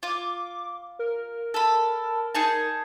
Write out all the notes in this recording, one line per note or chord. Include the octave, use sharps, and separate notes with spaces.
F4 D6
A#4
A4 B5
D#4 G#4 A5